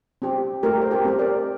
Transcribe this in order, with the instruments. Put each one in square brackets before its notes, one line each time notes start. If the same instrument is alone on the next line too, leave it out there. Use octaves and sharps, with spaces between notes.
[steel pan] C4 G4
A3 G4 A#4
C5
G4 A#4
C4 G4
A#4 D5